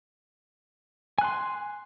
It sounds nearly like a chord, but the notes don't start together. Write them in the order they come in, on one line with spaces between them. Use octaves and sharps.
G#5 F#6 C6